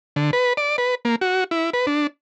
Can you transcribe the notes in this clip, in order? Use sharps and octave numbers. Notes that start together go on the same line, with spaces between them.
D3
B4
D5
B4
A#3
F#4
E4
B4
D4